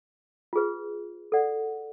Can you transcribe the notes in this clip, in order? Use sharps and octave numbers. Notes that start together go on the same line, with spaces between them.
F4 G#4 B4
A4 D5 F#5